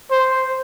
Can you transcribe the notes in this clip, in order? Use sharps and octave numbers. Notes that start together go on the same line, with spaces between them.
C5